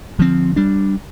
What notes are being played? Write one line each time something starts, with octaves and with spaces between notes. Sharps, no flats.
D3 F3 C4
G3 D4